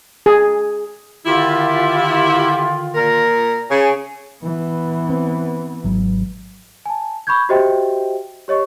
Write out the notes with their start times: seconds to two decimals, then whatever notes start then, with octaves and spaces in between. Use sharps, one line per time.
0.26 G#4
1.26 D3 D#3 E4 F4 G4
2.94 A#2 A#4
3.70 C#3 G#5
4.43 E3 B3
5.09 C4
5.84 G#1 F#3
6.86 G#5 A5
7.27 B5 C#6 D6 G6 G#6
7.49 F#4 G4 C5 D#5 E5 G5
8.48 G4 C#5 D#5 C#6